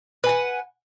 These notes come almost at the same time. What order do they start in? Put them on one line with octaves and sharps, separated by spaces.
B4 G#5 F#5